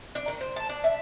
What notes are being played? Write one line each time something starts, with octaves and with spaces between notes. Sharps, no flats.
D4
D#3
C5
A5
D4
E5